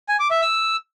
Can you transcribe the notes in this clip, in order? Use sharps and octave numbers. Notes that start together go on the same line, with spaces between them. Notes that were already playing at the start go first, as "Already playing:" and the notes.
G#5
D6
E5
E6